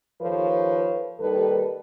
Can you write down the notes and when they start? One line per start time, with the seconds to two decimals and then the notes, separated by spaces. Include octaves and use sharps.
0.22 D#2 F3 A4 B4 C#5
1.20 D#2 D#3 G3 A4 B4